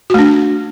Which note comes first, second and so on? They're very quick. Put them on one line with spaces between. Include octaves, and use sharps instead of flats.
F#4 A3 D4